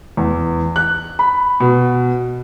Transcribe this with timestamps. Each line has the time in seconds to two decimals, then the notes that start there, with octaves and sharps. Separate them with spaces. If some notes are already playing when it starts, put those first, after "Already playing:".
0.17 E2
0.76 F#6
1.19 B5
1.60 B2